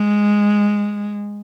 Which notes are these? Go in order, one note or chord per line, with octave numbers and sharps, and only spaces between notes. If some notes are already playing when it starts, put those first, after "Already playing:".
Already playing: G#3